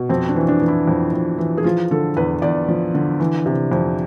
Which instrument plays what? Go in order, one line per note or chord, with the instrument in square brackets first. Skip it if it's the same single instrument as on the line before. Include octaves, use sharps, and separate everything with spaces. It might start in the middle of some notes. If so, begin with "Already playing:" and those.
Already playing: [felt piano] B2
F2 C4
D4
E3
D4
E3
E4
F2
F2
E3
G#4
F3 F4
D3 A4
E2 B4
E2 D5
F3
D3
E3
C3
F2